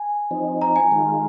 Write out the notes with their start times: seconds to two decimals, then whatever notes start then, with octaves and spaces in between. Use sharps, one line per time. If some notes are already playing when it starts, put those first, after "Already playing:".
Already playing: G#5
0.31 F3 C4 D#4
0.62 A#5
0.76 G#5
0.91 D#3 G#3 F4